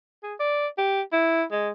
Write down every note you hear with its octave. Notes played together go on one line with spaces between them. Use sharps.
G#4
D5
G4
E4
G#3